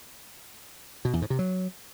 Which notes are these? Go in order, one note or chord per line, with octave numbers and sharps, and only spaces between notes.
B2
E2
G#2
C3
F#3